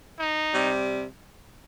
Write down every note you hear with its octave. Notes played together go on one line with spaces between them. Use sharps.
D#4
C3 G3